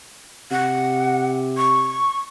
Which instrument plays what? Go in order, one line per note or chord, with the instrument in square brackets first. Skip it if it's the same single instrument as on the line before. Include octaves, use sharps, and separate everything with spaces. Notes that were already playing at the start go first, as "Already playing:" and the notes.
[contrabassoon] C3 [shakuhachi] F#5
[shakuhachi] C#6